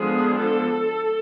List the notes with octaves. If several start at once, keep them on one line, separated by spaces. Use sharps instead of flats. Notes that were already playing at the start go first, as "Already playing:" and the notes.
Already playing: D3 F3 G#3 B3 D4 G#4
A4